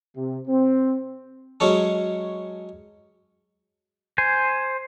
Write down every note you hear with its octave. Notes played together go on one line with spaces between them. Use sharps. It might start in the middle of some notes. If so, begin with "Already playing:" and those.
C3
C4
F#3 G#3 C#4 A4
C5 G#5